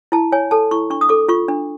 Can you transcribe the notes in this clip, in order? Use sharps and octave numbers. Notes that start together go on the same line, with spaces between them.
E4 A5
C#5 G#5
A4 A5
E4 C#6
D4 C#6
D#6
A4 D6
F4 C#6
D4